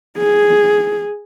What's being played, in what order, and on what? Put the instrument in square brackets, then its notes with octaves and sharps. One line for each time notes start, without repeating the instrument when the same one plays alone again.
[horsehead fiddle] G#4